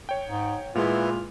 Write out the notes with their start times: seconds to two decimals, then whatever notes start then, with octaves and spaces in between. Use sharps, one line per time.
0.09 C#5 G5
0.26 G#2
0.75 A#2 E3 G#3 B3 F4 G#4